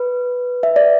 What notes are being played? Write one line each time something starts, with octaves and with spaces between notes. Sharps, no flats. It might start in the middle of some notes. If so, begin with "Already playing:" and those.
Already playing: B4
E5
D5